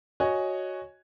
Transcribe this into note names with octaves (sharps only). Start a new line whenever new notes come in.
F#4 C#5 D#5 G#5